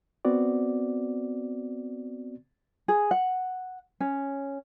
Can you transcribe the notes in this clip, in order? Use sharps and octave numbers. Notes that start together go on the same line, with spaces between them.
B3 C4 F#4 D5
G#4
F#5
C#4